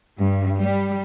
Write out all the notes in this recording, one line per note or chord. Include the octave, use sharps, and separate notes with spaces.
G2
G3